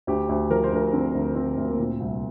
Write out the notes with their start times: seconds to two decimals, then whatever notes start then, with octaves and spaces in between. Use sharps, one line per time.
0.07 D2 G4
0.29 D2
0.50 F3 A#4
0.64 C5
0.72 D2 A#4
0.93 D3 C4
1.15 D2
1.35 D2 C4
1.58 D2
1.69 A#3
1.79 A#2 C4
2.00 C2